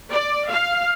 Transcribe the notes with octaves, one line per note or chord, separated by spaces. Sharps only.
D5
F5